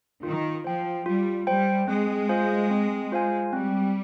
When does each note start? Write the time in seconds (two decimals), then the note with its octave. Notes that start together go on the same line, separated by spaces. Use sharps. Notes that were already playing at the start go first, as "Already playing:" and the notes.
0.23 D#3 F4
0.64 F3 C5 G5
1.05 G3 F4
1.47 G3 C5 G5
1.88 G#3 C4
2.29 F4 C5 F5 G#5
2.70 C4
3.12 F4 C5 F5 G#5
3.53 G3 C4